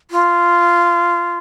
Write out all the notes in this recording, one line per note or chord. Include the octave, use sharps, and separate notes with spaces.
F4